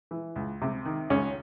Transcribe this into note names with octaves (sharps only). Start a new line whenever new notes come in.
E3
C#2
C3
D#3
C#2 C#4